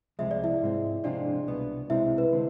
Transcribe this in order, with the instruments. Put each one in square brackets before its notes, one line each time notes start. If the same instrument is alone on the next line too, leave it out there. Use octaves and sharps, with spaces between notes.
[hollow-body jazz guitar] C2 C3 F3 G#3 [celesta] E5
[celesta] D5
E4 E5
[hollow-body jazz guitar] G#2 G#3 C4
[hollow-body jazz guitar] C3 F3 G#3 C4 F4 [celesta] D4 D5
[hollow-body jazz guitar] C2 B2 B3
[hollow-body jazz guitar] C2 C3 G#3 C4 [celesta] E4 E5
[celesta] B4
[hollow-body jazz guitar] D3 G#3 C4